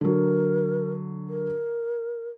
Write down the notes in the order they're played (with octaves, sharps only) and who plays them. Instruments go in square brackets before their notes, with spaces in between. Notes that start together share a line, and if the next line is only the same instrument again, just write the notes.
[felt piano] D3 F#3 [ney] A#4
[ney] A#4